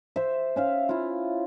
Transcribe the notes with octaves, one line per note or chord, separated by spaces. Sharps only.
C5 E5
C#4 E5 F5
E4 F4